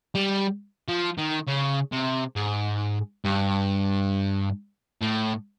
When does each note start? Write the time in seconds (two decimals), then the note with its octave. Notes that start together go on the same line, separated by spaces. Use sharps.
0.15 G3
0.88 F3
1.18 D#3
1.47 C#3
1.92 C3
2.36 G#2
3.25 G2
5.01 A2